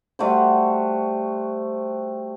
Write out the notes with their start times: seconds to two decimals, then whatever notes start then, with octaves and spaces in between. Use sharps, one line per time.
0.19 G3 A3 F#4 C5